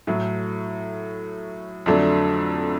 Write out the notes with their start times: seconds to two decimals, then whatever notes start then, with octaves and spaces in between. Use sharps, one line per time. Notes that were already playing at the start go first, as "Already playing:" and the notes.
0.07 A2 F#3 A3
1.86 F2 D3 F#3 A3 D4